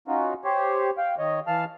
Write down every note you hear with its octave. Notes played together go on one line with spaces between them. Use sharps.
C#4 D#4 F4 F#4
G4 C5 C#5
F5 G5
D#3 C#5 D#5
E3 F5 A5 F6